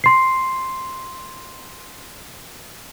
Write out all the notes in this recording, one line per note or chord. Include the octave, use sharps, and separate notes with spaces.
C6 C7